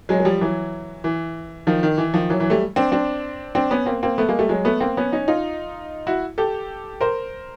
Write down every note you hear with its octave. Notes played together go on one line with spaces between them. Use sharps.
F#3 G#3
G#3
F3 G3
E3 F#3
E3
D#3 F3
D#3
E3
D#3 F3
E3 F#3
E3 F#3
G3 A3
C4 D4
C4 D4
C4 D4
B3 C#4
A#3 C4
A#3 C4
A3 B3
G#3 A#3
G3 A3
F#3 G#3
A3 B3
A#3 C4
B3 C#4
C#4 D#4
D#4 F4
E4 F#4
G4 A4
A#4 C5